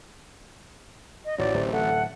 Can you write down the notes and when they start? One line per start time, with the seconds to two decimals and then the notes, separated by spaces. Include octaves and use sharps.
1.25 D#5
1.39 A1 D#2 F#3 D5
1.54 D1 C3
1.73 A3 F#5